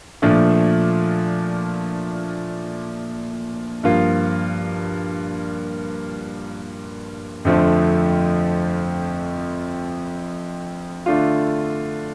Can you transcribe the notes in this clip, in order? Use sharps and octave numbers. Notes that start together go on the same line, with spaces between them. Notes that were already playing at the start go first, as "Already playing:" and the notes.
A#2 F3 A3 D4
G2 F3 A#3 F4
F2 D3 F3 A3 C4
D3 A3 D4 F4